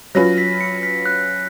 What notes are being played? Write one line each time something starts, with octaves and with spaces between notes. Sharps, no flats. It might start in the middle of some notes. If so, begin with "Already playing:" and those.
F#3 C#4 F4 B4 A#6
B6
C#7
B6
F#6